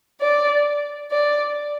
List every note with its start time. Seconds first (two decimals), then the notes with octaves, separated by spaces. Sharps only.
0.21 D5
1.11 D5